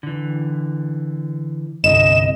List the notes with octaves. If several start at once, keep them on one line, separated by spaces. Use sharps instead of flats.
D3 E3
G1 C2 D#5 E7